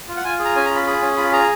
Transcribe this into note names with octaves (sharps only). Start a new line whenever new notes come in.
F4
F#5
F4 G#5
G#4
A#5
C#4 G#5
A#5
F4
B5
G#4 B5
C#4
F4 B5
G#4 A#5